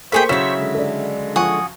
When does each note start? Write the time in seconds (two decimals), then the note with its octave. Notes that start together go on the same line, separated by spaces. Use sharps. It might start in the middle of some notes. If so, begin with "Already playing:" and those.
0.12 A#3 E4 G#4 A4 C5 G5 C#6 B6
0.29 C#3 F#3 E4 E5 B6 E7
0.58 D3 G#3
0.75 D4 A4
1.36 F3 F#5 G#5 C#6 D#6